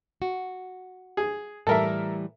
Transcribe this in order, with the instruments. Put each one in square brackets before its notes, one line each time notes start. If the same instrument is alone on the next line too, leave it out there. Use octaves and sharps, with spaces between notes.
[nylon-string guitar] F#4
[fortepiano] G#4
[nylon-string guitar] A2 E3 G3 [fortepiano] A4 A#4 E5